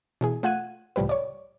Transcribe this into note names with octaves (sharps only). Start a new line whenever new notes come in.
B2 E3 G#4
A3 F4 F#5 F#6 G#6 D#7
C#2 A2 F3 G3 G4 B4
C#5 D5